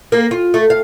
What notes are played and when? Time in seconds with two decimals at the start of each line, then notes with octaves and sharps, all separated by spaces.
0.12 A#3
0.31 F4
0.54 A3
0.70 F5